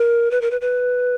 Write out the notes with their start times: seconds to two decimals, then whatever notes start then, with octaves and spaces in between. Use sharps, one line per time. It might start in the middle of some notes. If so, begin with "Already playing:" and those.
Already playing: A#4
0.31 B4
0.41 A#4
0.51 B4
0.61 B4